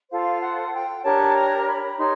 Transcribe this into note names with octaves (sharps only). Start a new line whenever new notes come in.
F4 A4 C5 F5
F#5
G5
D4 G4 A#4 C#5 A5
A#5
B5
D#4 G4 A#4 C#5 C6